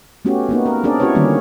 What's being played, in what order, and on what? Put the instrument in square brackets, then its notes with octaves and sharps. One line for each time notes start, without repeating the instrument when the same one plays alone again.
[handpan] A3 B3 C#4 F#4 G4
A#3 B3 D#4
A#4
C4 D4 G#4 A#4 D5
C#4 E4 F#4 G4 B4 C#5
D3 D#3 G3 A#3 C#4